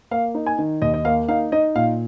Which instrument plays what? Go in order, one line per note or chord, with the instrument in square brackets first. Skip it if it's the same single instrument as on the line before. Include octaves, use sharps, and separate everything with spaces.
[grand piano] A#3 F5
D#4
G#5
D#3
D#2 D#5
D#5
A#3 F5
D#4 F5
D#4 D#5
A#2 F5